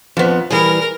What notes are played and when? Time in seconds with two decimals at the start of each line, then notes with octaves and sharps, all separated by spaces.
0.17 F2 F3 B3
0.50 E3 G3 G#4 A#4